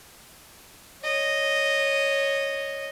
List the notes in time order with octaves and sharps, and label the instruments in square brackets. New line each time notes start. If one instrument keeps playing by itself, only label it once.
[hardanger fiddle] C#5 D#5